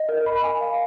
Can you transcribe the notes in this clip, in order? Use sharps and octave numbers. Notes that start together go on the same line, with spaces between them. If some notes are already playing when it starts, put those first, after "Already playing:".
Already playing: D#5
A#4
B5
G#5
F5